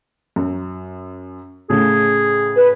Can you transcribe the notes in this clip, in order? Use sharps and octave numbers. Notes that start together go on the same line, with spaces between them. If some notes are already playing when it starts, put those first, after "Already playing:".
F#2
A2 C#3 A3 G#4
B4